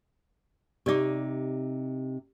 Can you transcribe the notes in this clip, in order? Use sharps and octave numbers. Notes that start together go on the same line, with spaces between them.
C3 D#4 G4 D5 D6